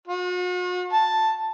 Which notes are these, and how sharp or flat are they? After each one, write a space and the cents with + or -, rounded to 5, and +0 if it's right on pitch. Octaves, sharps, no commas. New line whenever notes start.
F#4 -45
A5 +5